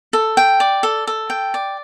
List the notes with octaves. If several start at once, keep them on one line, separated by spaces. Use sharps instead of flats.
A4
G5
D5
A4
A4
G5
D5